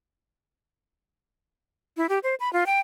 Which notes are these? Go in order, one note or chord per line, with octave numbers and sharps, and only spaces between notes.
E4
G4
C5
B5
F4
G5